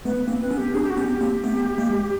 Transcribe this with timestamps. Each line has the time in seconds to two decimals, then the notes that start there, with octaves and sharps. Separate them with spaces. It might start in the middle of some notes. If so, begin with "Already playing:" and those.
0.05 A3 B3 B4
0.28 A#3 C4
0.40 C4 B4
0.51 B3 C#4
0.57 G4
0.74 C4 D4 G#4
0.82 G4
0.90 F#4
0.97 B3 C#4 G4
1.09 G4
1.21 A#3 C4
1.44 A3 B3
1.78 G#3 A#3